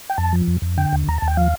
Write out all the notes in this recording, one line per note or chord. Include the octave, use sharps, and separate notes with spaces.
G5
F2 A5
F3
F2
F2
D3 G5
D#2
D#2 A#5
D#2 A5
G5
F3 F5